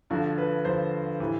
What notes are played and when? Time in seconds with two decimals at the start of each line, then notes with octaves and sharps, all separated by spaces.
0.10 G2 D3 F3 F#4
0.38 B4
0.65 G2 D3 F3 C5
1.20 A2 E3 G3